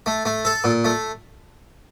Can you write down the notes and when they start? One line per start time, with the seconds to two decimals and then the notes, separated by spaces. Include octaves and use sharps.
0.06 A3
0.25 A3
0.45 A4
0.64 A#2
0.85 A3